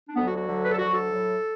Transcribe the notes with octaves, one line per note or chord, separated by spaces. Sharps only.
D4
D2 D3 F#3 B3
F#4
F#4
D2 D3 F#3
B4
A4
D2 D3 F#3 F#4
A4
A2 F#3